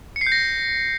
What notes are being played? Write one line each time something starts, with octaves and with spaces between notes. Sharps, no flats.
C#7
C7
G6
A#6